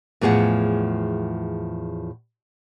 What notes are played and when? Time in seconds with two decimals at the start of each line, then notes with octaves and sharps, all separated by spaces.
0.21 E2 A2 F3 G#4 F#5